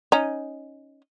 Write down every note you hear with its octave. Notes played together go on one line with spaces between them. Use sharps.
C#4 D#4